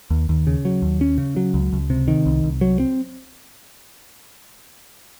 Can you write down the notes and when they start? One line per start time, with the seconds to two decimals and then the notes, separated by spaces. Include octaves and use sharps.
0.10 D#2
0.29 D#2
0.47 C#3
0.65 F#3
0.82 D#2
1.01 C#4
1.18 C#3
1.36 F#3
1.54 C#2
1.73 C#2
1.90 C3
2.08 D#3
2.26 C2
2.44 C2
2.61 F#3
2.80 C4